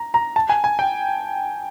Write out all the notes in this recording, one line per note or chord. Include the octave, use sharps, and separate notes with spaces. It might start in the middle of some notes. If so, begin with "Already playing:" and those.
Already playing: A#5
A#5
A5
G#5
G#5
G5